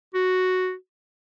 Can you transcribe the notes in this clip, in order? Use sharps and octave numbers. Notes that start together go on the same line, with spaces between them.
F#4